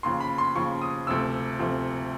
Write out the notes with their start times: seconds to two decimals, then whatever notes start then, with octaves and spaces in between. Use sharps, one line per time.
0.03 D#2 C#3 F3 C6
0.20 B5
0.38 C6
0.55 D#2 C#3 F3 C#6
0.82 D#6
1.07 D2 C3 F3 E6
1.59 D2 C3 F3